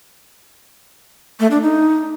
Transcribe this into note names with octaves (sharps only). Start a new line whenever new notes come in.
A3
D4
D#4